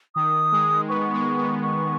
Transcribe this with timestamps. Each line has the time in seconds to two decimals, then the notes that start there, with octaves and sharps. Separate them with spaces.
0.15 D#3 D#6
0.52 G#3
0.89 B3 C#6
1.14 G#3
1.38 B3
1.63 C#6